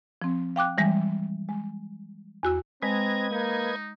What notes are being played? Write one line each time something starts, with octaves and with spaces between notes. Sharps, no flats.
F3 C4
F5 G5 D6 F#6
E3 G3 G#3
G#3
E2 F#4 E6
G#3 C4 B4 D#5 A#5 G#6
A#3 D#4